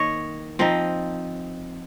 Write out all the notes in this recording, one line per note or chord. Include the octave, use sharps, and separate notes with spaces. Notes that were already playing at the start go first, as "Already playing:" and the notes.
Already playing: D#3 A#3 C#5 D#5
F3 C4 D#4